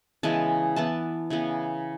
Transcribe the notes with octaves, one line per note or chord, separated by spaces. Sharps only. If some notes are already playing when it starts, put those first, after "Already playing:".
C#3 E3 G#3 B3 A5
E3 B3 A5
C#3 E3 B3